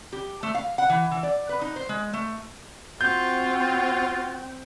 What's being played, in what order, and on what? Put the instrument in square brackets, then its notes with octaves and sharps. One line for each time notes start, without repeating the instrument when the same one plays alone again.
[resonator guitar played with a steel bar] G4
A3
F5
F#5
E3
E3
D5
B4
D#4
C5
G#3
A3
[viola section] C4 G5 [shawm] F4 [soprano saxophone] F#4 [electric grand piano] G6